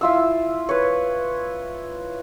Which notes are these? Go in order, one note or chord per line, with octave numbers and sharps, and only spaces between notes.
E4 F4 E6
B4 C#5